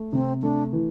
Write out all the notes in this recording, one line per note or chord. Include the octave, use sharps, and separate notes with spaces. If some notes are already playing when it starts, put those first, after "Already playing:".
Already playing: A3
C3 C4
A3 D4
E3